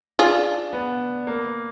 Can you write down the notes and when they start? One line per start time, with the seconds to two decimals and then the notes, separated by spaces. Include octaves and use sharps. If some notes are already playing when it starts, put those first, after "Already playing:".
0.19 D4 F4 G#4
0.73 B3
1.27 A#3